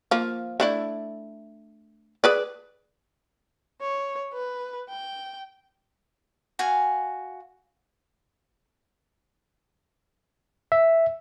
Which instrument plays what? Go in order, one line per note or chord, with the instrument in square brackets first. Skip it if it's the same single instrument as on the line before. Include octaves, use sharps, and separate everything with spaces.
[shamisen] F3 A#3
A3 D4 E4
G#4 B4 D5
[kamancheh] C#5
B4
G5
[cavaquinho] F#4 F5 G#5
[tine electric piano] E5